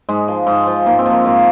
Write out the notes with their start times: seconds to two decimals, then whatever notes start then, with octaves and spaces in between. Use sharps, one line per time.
0.09 G#2 G#3
0.28 F3
0.47 G#2
0.67 F3
0.86 G#2 A#3
0.99 C4
1.06 F3
1.12 A#4
1.25 G#2 A#4